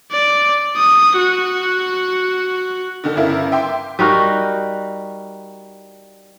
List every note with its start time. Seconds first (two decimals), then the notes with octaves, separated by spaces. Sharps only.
0.12 D5
0.76 D#6
1.18 F#4
3.04 D3 D#3 A4
3.16 G1 C#3 E4 A#4 F5
3.52 E5 G5 C6 D6
3.99 G3 D#4 F#4 A#4